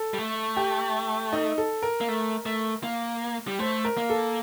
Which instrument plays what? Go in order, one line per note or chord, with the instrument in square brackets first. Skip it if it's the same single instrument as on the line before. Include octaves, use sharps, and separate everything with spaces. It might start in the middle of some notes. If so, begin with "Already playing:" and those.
Already playing: [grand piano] A4
[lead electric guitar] G3
A3
[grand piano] G4
D#4
A4
A#4
[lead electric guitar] A#3
A3
A3
A#3
G3
[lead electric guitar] A3 [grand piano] C5
[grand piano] A#4
[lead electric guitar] A#3
[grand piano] A4